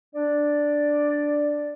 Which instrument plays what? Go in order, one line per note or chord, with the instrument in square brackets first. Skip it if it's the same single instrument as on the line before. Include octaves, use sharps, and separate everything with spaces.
[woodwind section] D4 D5